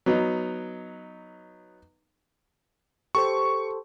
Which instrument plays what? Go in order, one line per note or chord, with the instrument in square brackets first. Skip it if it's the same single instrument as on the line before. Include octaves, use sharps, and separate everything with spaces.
[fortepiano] F#3 B3 D#4
[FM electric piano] G4 A4 C5 [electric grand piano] C#6